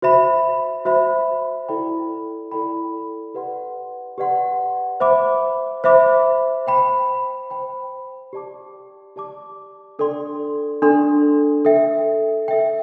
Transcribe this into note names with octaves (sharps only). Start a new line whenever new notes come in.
F#4 C5 E5 B5
F#4 C5 E5 B5
E4 A4 D5 G5 B5
E4 A4 D5 G5 B5
G4 B4 D5 F#5 C6
G4 B4 D5 F#5 C6
C5 E5 B5 D6
C5 E5 B5 D6
C5 G5 B5
C5 G5 B5
G4 D5 A5 D6
G4 D5 A5 D6
D4 A4 D5 G5 C6
D4 A4 D5 G5 C6
A4 E5 G5
A4 E5 G5